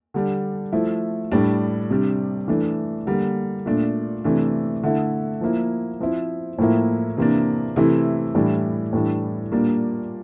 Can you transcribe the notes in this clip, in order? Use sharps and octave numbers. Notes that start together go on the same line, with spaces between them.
D3 G3 D4
F3 A3 E4
A2 G3 D4
C3 G3 D4
E3 A3 D4
D3 G3 A#3
A#2 A3 D4
C3 E3 A3 D4
D3 A3 E4
F3 A#3 E4
F3 C4 E4
A2 F3 A#3 E4
C3 E3 A#3 D4
C3 E3 A3 E4
A2 E3 G3 D4
A2 E3 G3 D4
A#2 G3 A#3 D4